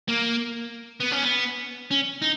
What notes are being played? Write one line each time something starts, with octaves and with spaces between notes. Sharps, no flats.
A#3
B3
C#4
B3
C#4
D#4